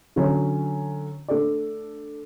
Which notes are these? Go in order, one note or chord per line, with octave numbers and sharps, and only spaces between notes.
D3 F#3 C#4
A3 D4 A4 D5